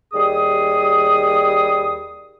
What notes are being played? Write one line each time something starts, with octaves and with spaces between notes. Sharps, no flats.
D#2 G3 G#4 D#6